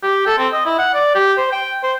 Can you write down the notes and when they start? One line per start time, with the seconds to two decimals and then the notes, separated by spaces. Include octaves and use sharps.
0.03 G4
0.27 A4
0.38 C4
0.53 D#5
0.65 E4
0.79 F#5
0.94 D5
1.15 G4
1.37 C5
1.52 G5
1.83 C5